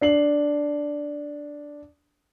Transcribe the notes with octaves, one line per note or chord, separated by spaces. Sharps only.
D4 C7 F#7